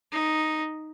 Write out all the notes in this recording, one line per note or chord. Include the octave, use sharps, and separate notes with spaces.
D#4